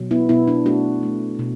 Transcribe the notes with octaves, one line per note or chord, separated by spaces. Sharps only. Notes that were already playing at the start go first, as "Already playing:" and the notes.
Already playing: B2 F#3
B3 E4
B2 B3 E4
D4
A3 D4 F#4
A3
B2